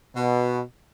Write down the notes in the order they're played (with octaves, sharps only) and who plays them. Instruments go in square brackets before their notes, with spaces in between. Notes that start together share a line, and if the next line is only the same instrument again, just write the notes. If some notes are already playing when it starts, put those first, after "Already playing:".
[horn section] B2